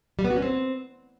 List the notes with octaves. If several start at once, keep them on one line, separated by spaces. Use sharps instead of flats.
G3
B3
F#4
C#4
C4